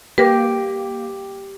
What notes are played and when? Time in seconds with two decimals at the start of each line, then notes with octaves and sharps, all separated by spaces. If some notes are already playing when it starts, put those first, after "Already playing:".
0.18 A#3 G4 A#4 B4